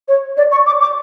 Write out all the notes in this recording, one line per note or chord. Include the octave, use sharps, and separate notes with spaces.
C#5
D5
C#6
D6
D6